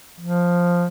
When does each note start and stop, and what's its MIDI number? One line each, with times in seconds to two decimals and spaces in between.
0.20 0.86 53